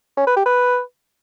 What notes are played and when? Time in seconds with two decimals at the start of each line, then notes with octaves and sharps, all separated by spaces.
0.17 C#4
0.27 B4
0.36 G4
0.46 B4